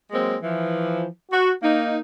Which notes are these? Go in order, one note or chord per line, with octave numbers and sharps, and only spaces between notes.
F#3 G#3 A#3 C4
E3 F3
F#4
A#3 D#4